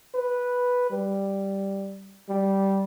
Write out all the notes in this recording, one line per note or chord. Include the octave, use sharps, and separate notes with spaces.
B4
G3
G3